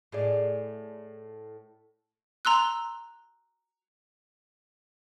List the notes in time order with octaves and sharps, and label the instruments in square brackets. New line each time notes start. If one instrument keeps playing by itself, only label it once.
[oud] A2 G#4 D5
[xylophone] A#5 C6 E6 F#6